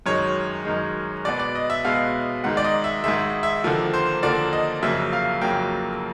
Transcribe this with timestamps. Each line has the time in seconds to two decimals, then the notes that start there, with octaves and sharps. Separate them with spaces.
0.06 F#2 D#3 G#3 C#5
0.65 F#2 D#3 G#3
1.25 B2 G#3 B3 D5
1.40 D5
1.55 D#5
1.70 E5
1.85 B2 G#3 B3 F5
2.44 G#2 D#3 G#3 F#5
2.57 D5
2.64 D#5
2.84 E5
3.04 G#2 D#3 G#3 E5
3.43 E5
3.64 D#2 D3 F3 A#3
3.94 C5
4.22 D#2 D3 F3 A#3 D5
4.53 D#5
4.82 F2 C#3 F#3 A#3 E5
5.13 F5
5.41 F2 C#3 F#3 A#3 G5